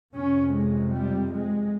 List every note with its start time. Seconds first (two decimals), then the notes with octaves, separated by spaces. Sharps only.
0.14 F2 C3 C#4
0.54 G#3
0.94 G3
1.34 G#3